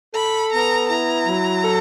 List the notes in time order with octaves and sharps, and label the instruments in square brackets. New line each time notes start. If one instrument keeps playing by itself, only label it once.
[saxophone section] A4 [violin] B5
[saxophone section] B3 [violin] A#5
[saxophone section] E4 [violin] A#5
[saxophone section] F#3
A4